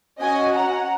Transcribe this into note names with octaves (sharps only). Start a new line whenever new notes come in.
C#4 F#4 D#5 G#5
F#5 A#5